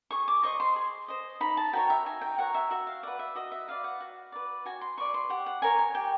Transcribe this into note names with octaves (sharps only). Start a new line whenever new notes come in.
G#4 C#6
D6
C5 D#5 C#6
C6
G#4
C5 D#5
D#4 B5
A5
F#4 A#4 C#5 G5
E5
D#4 G#5
G5
F#4 A#4 C#5 F#5
E5
F#4 E5
F5
B4 D5 F#5
E5
F#4 D#5
E5
B4 D5 F5
F#5
F#4
B4 D5
F#4 G#5
C6
B4 D5 C#6
C6
G4 F#5
F#5
A#4 C#5 G#5
G#5
G4 G5